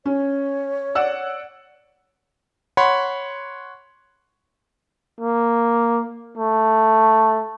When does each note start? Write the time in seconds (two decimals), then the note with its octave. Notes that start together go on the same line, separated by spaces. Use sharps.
0.06 C#4 C#5
0.95 D5 F#5 E6
2.77 C#5 F#5 B5 C6
5.21 A#3
6.38 A3